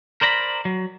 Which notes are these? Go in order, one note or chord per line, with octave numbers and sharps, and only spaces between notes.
A#4 C5 D5 A#5 B5
F#3